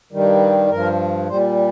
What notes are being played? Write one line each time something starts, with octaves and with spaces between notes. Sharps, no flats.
G2 D#3 G3
G2 F3 A#4
A#2 G3 C5